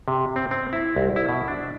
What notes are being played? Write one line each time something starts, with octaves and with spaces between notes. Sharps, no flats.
C3
C4
C4
E4
C2
E4
B2
D4